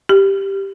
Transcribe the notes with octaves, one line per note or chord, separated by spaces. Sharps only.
G4